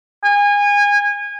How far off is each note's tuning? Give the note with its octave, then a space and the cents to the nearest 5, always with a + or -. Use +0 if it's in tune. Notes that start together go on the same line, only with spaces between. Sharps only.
G#5 -25